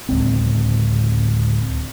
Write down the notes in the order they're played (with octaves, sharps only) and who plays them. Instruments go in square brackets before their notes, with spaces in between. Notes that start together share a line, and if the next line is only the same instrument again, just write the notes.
[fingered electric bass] D1 C#2 C4